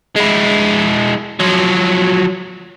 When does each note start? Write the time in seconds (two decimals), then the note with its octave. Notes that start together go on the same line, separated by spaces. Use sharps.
0.16 G#3 E4
1.40 F3 F#3